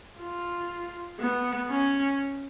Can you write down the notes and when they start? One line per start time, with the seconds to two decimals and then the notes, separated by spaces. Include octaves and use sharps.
0.18 F4
1.19 B3
1.69 C#4